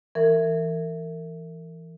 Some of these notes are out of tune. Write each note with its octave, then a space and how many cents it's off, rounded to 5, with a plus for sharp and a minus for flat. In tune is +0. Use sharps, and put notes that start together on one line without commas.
E3 +5 A#4 -35